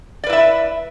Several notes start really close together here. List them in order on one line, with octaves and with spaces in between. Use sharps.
D5 B4 E4 E5